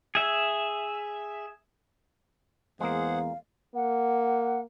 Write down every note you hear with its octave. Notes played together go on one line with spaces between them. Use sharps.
G#4 E5
E2 G#3 A#3 G#4 C5 F5 F#5
A#3 F#5